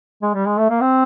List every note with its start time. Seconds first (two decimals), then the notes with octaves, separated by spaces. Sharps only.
0.23 G#3
0.35 G3
0.46 G#3
0.58 A3
0.70 A#3
0.81 C4